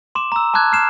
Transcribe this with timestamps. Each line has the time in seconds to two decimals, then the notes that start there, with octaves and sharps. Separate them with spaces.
0.15 C6 D6 E7
0.32 A#5 E6
0.54 A5 C6 D6 F#6 G#6
0.72 F6 C7 E7